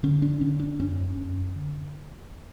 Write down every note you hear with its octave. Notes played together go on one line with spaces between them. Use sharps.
D3 C#4
D4
D3 C#4
D4
F#2 C#4
F#2
D3